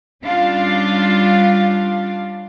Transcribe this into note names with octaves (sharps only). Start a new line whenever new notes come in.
G3 C#4 D4 F4 F5